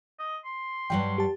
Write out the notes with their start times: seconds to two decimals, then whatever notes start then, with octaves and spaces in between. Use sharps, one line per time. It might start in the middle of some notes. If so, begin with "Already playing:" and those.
0.19 D#5
0.45 C6
0.90 G2 F#3 G3 G5
1.18 G4 A5